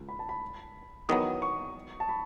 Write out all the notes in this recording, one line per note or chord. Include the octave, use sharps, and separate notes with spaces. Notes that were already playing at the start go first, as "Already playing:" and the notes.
Already playing: C#2
B5
A5
B5
E2 D#3 F#3 B3 D#6
C#6
A5
B5